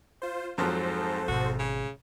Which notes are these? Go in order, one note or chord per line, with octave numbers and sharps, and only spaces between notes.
F4 C5
F2 G#2 F3 F#3 A4 C5
G#1 B2 F#4
C#3